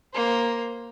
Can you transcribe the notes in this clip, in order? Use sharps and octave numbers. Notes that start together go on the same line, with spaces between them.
A#3 C5